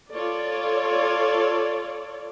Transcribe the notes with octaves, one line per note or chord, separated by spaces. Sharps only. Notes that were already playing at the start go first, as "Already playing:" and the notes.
F4 A4 C#5 D5